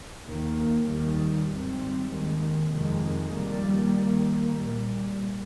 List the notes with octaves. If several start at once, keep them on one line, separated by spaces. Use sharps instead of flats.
D#2 D#3 A#3
D#2 D#3 G3
G#1 G#2 G3 C4
D#2 D#3 G#3
F2 C3 D#3 G#3
F2 D#3 G3 A#3
D#2 D#3 A#3
A#1 A#2 G3